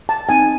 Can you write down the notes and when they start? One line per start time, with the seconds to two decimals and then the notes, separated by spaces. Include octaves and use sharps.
0.09 A5
0.29 C4 D#4 G#5